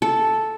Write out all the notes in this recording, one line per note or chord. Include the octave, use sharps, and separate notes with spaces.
A4